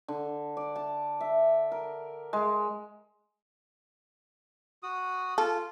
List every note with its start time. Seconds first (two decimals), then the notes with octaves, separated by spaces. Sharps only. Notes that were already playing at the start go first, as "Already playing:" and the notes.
0.08 D3
0.57 D5
0.76 A5
1.20 E5
1.72 A#4
2.33 G#3
4.83 F#4 D#6
5.38 F4 A4